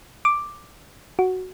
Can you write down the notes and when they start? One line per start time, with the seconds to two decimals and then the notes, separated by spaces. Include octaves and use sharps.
0.25 D6
1.19 F#4